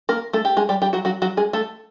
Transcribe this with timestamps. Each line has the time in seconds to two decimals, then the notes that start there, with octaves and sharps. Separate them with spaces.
0.09 A#3 A#4
0.33 A3 A4
0.45 G4
0.57 G#3 G#4
0.69 G3 G4
0.82 G3 G4
0.93 F#3 F#4
1.05 F#3 F#4
1.22 F#3 F#4
1.37 G#3 G#4
1.53 A3 A4